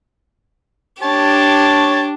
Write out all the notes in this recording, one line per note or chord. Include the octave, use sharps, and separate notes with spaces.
D4 G4 C#5 A5